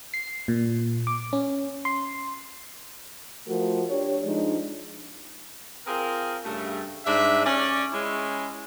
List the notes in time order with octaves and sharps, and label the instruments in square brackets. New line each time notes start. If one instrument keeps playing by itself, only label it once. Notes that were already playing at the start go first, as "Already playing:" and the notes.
[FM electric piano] C7
A#2
D6
C#4
C6
[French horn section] F3 A3 F#4 A#4
D4 G4 C#5
F3 G#3 D4 D#4
[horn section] C4 F4 G#4 A#4
G2 C#3 A3
G#2 G3 D4 E5
C#4 D5
G#3 C#4 E4